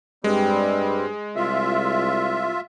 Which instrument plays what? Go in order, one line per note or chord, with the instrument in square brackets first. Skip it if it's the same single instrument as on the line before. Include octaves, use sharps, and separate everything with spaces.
[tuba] G2 [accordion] G3 C4 [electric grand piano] G#3
[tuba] C2 [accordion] F4 E5